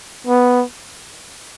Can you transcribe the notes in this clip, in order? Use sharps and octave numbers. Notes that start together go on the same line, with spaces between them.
B3